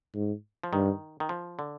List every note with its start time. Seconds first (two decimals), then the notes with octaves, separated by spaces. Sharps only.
0.14 G#2
0.63 F3
0.72 G2 D#3
1.20 D#3
1.29 F3
1.59 D3